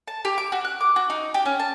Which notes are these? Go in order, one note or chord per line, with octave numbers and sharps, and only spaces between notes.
A5
G4
D6
F#4
F#6
D6
F#4
D#4
G4
C#4
A5